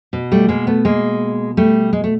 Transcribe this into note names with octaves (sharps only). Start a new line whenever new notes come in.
B2
G3 A3
G#3 A#3
A3 B3
G#3 A#3
G3 A3
G#3
A3